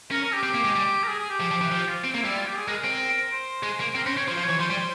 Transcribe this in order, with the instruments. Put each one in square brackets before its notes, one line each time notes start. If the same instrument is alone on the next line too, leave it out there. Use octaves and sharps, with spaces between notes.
[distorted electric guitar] C#4 [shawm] A#4
[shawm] A#4
G4
[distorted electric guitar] C4 [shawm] G4
[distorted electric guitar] A#3
G#3
G3
[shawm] A#4
G#4
G#4
G4
[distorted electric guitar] F3
F3
E3
[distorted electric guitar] F3 [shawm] G4
[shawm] F4
[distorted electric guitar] C4
A#3
[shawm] E4
[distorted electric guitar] G3
[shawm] F4
G4
G#4
[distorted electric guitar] G#3 [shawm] A#4
[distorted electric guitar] C4
[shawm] C5
[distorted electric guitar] G#3
A#3
[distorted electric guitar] C4 [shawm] A#4
[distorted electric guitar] C#4 [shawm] C5
[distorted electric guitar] C4 [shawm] C#5
[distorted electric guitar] F3 [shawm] C5
[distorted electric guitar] F3
[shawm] C#5
[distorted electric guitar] E3
[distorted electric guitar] F3 [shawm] C5
[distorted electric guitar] G3